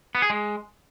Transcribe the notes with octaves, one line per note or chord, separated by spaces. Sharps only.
B3
G#4
G#3